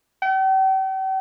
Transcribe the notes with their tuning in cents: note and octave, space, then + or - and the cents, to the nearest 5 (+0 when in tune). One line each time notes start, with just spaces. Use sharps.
G5 -45